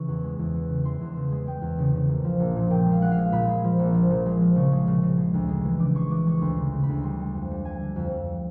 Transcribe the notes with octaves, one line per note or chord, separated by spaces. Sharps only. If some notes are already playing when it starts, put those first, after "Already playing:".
Already playing: C#3 E3 C#6
E2
G#3
E2
E3
C#3
E3 C6
E2
C#3
G#3
G#3 G5
E2
C#3
C#3
A#1
F3
A#1
A#2
A#2 G5
G#3
F5
G#3 F#5
F5
G#3
A#2 B5
G#3
F3
A#1
F3
A#2
G#3
F3
C#3 C#6
G#3
C#3
C#3
G#3
D2
G#3
E3
C#3 D6
G#3 C#6
E3 D6
G#3 C#6
D2 C6
C#3
C#3
B5
D2
G3 C6
G3
F2
G3
G3 G#5
D3
F2
F2